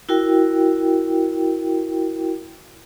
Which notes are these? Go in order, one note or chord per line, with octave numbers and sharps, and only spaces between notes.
E4 F#4 A#4 G5